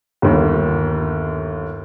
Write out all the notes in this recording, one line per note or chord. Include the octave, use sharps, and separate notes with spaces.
G1 D#2